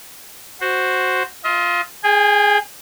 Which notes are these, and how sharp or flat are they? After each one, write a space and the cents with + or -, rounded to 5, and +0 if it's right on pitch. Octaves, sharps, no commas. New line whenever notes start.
F#4 +0 C5 +0
F4 +0 D#5 +35
G#4 +0 G5 +45